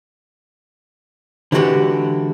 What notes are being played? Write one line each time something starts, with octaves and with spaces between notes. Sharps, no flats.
D3 E3 G#3 C4 F#4 G4